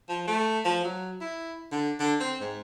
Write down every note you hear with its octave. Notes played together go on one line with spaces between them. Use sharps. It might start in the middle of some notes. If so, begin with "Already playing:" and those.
F3
A3
F3
F#3
E4
D3
D3
C4
G#2